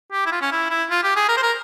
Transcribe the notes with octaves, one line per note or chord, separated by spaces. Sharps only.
G4
E4
F4
C#4
E4
E4
F4
G4
G#4
A#4
C5
A#4